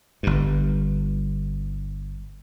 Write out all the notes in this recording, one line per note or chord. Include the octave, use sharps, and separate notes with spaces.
G1 G2